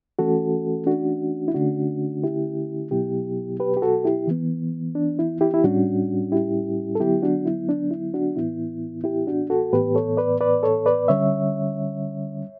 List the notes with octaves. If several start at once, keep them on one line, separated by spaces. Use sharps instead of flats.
E3 A3 C#4 F#4 A4
D4 F#4
E4
D3 A3 C#4 D4 F#4
E4 G4
B2 F#3 B3 E4 G4
G4 B4
G4
F#4 A4
E4 G4
E3 B3
D4
E4
E4 G4
E4
A2 G3 C#4 D4 F#4
E4 G4
A4
D3 F#3 B3 E4 G4
D4 F#4
E4
D4
E4
D4 F#4
A2 E3 B3 E4
E4 G4
D4 F#4
F#4 A4
A2 E3 B3 G4 B4
A4 C#5
B4 D5
B4 D5
A4 C#5
B4 D5
D3 G3 C#4 C#5 E5